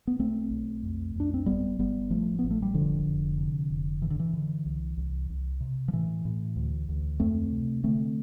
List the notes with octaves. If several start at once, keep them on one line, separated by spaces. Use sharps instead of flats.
B3
B1 A3 C4
B1
F2
F2 D4
C4
G1 G3 B3
G1 G3 B3
A1 F3 A3
A1 B3
A3
G3
F1 D3 F3
F1
C3
F1
G2 E3
D3
E3
D3
C2
C2
C2
C3
F3
A2 E3
A2
D2
D2
F2 A3 C4
C3
D3 A3 C4